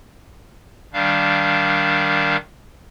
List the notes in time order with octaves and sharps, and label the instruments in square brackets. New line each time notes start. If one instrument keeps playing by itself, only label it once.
[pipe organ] D#3 G3 D4 F5